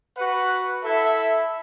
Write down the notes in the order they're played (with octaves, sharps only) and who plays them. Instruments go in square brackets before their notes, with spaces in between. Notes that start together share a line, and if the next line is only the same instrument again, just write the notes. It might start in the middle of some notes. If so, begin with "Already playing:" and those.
[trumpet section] F#4 B4 F#5
E4 A4 E5